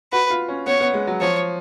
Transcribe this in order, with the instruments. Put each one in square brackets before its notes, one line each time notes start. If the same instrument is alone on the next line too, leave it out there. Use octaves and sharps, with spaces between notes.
[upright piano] F#4 [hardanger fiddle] B4
[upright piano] F4
C#4
[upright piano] B3 [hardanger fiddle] C#5
[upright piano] B3
G#3
F#3
[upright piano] F3 [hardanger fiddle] C#5